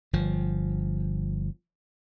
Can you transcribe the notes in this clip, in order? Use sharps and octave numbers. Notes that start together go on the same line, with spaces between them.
G1 F3